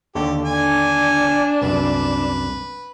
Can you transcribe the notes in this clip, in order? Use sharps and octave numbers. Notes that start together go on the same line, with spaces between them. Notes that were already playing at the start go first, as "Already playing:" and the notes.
D#2 D3 G4 A4
D4 G#5
C2 F#2 B4